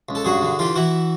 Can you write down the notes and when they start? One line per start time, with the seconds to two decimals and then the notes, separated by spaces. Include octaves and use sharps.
0.09 C#2
0.15 A4
0.25 G2 F#4 G#4
0.42 D3
0.59 E3 F4 G4
0.75 E3 E4 F#4